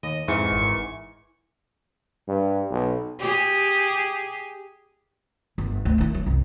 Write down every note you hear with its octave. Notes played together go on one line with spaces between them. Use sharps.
D#2 D#5
F2 G#2 E3 C#6
G#1
G2
B1
G4 G#4
G1
D2
D#3 E4
F#3
C2 F#2